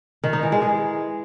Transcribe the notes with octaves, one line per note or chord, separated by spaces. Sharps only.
D#3
D#4
E3
G#3
G#4